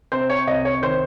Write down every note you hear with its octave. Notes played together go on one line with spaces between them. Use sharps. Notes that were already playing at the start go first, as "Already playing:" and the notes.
C3 C5
C#5
C2 D#5
C#5
D#3 C5